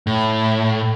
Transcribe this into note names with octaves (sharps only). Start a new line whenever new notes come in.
A2